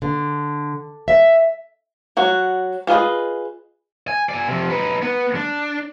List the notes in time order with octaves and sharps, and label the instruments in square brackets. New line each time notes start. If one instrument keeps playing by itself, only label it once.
[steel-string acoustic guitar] D3
E5
[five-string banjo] F#3 F#4
D4 F4 G#4 B4 D#5
[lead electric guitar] G#5
D5 G#5
C3 F3
D#4 B4
B3
D4